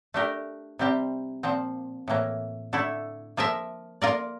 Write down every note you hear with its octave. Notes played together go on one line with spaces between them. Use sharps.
A3 D4 G4 A#4
C3 G3 C4 G4
A#2 F3 C4
A2 E3 A#3
D3 A3 E4 A4
F3 A#3 F4 A#4 E5
A#3 F4 A#4 D5